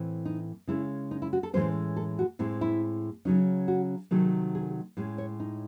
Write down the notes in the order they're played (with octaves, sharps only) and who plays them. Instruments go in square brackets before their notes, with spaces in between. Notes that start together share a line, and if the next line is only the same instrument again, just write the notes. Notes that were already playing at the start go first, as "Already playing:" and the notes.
Already playing: [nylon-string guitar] A2 E3 C4
D#4
C#3 G#3 C#4 E4
D#4
E4
F#4
A4
A2 E3 G#3 C#4 C5
A4
F#4
A2 G#3 C4 E4
E4
C#3 F#3 C#4 D#4
F#4
C3 D#3 F#3 A3 G#4
G#4
A2 G#3 C#4
C#5
D#4